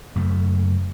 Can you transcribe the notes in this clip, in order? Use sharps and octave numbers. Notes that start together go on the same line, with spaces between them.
F#2 C#3 A3